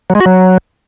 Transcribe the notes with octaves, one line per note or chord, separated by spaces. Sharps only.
F#3
G#3
F#4
F#3